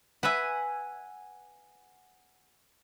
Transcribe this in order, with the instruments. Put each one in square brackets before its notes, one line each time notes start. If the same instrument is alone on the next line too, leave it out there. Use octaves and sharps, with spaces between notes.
[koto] B4 E5 [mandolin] F#5 G#5